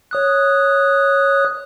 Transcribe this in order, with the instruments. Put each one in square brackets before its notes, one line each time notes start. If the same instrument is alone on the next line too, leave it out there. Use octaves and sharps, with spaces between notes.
[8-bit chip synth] C#5 D#6 F#6